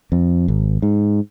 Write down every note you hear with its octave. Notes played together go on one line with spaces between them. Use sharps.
F2
G#1
G#2